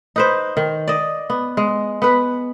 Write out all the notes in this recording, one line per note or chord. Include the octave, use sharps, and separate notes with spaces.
D#4 B4 C5
D#3
D5 D#5
B3
G#3
B3 B4